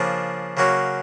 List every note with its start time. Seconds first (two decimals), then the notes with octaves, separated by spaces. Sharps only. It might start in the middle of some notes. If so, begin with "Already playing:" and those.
Already playing: C#3 F3 A#3 D4
0.57 C#3 F#3 A#3 C#4 F#4